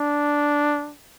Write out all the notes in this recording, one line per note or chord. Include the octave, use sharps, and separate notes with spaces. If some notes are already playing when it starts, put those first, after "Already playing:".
Already playing: D4